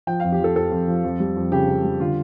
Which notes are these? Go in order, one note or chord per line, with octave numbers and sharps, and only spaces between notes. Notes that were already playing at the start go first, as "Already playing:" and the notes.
F3 G5
F2 F5
G4
F3 A4
F2 A4
F2
F3
F2
G3
F2
C#3 G4
C#3
G3
D3 F4